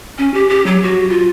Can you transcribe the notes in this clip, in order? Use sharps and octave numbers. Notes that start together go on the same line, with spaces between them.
C#4
G4
G4
F#3
F#4
F4